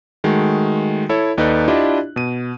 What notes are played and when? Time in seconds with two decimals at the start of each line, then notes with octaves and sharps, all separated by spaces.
0.24 D#3 G#3 A3 F#4
1.09 E4 A4 C#5
1.38 D#2 D#4 A4 B4 D5 F#6
1.68 D4 E4 F4 G4 D5 D#5
2.16 B2 D#7